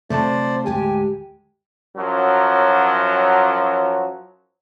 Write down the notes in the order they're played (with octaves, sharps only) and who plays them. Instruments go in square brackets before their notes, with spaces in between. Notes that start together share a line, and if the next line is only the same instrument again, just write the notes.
[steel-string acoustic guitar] C3 F#3 F4 [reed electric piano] A3 A5 [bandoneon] C5 D5
[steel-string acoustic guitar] D2 G#2 G#3 [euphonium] G4 [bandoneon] G#5
[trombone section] F#2 F3 F#3